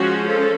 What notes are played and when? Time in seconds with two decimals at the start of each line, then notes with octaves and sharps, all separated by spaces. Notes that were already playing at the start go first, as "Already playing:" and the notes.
Already playing: F3 G#3 C#4 F#4
0.27 A4